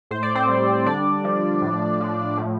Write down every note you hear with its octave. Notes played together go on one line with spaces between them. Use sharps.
A2 C5
D5
C4 C5
G3
D3 D4 D5
F3
A2
F3
A2